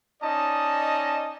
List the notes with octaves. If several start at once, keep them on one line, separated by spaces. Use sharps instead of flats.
C#4 D#4 D5 D#5 A5